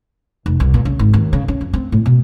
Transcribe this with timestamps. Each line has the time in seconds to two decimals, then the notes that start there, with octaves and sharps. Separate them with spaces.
0.46 F1
0.60 C2
0.74 A#2
0.85 C#3
0.99 G#1
1.13 D#2
1.33 C#3
1.48 C#4
1.61 F2
1.73 C4
1.92 A2
2.06 B2